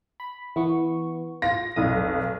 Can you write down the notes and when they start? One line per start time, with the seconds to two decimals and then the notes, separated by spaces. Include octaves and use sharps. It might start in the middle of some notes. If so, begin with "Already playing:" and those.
0.20 B5
0.56 E3 B3 C#6
1.42 F4 A#6
1.76 F1 B1 D#6